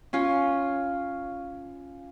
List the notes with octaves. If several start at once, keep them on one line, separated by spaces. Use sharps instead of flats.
C#4 F4